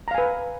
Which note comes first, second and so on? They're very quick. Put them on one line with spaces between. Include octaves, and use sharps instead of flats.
A#5 F5 G#5 B4